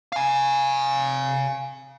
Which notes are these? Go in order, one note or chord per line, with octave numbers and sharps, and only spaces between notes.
F5 G#5